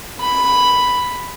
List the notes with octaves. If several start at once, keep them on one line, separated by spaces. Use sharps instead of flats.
B5